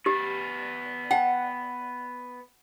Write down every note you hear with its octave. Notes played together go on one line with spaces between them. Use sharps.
B3 G4 D5
F#5 G5